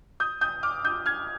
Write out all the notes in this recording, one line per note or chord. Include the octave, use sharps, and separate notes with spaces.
D#6 G6
D#6 G6
D6 F6
D#6 G6
F6 G#6